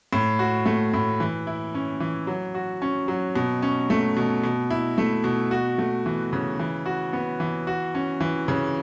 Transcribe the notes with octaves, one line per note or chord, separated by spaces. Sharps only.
A2
F#4
A3
A2
E3
E4
C#4
E3
F#3
F#4
C#4
F#3
B2
C#4
A3
B2
B2
E4
A3
B2
F#4
A3
E3
C#3
E3
F#4
B3
E3
F#4
C#4
E3
C#3